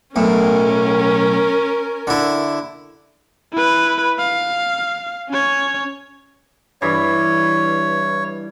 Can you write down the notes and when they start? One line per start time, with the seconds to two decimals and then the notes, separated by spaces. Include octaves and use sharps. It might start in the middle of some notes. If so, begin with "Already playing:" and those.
0.16 B1 A2 C#4 A#4
2.07 D3 E4
3.53 E4 B4
4.18 F5
5.29 C#4 C#5
6.82 G2 E3 C#5